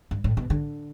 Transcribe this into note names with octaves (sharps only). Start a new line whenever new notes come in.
G2
A2
B2
D3